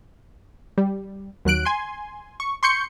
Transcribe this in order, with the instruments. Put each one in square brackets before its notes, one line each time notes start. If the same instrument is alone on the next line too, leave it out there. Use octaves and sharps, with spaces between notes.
[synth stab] G3
D#2 F#3 F#6 D7
G#5 C6
C#6
C6 C#6 G6 C#7